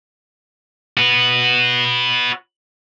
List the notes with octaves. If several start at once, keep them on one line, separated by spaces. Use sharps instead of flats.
F#4 B4